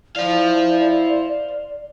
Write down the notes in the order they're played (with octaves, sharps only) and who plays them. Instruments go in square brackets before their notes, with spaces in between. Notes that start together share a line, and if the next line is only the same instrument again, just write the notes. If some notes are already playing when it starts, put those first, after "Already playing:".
[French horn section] E4 [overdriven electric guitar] C5 F5 [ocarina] D5